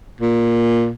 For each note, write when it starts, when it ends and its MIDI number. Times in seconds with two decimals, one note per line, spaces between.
0.21 0.90 46